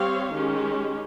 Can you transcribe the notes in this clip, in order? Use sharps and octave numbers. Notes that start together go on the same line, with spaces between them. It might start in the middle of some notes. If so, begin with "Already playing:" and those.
Already playing: G3 C4 G4 C#5 F5
D#3 G#3 C#4 G4